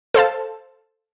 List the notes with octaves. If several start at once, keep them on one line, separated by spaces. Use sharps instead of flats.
A4 C5 F5 A5